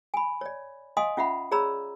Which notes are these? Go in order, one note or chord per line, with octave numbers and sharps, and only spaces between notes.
G#5 B5
C#5 D5
D#5 F5 G#5 C6 D#6
C#4 F4 E5 F#5 B5
G#4 C#5 D5 A#5 B5 E6